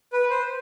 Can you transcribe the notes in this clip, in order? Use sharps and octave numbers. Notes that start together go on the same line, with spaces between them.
B4
C5